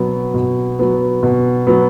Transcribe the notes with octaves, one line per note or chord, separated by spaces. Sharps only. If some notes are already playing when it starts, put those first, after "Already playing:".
Already playing: B2 F#3 B3
B2
F#3 B3
B2
F#3 B3